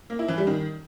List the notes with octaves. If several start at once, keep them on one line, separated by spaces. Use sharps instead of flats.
A#3
E4
E3
G3
D#3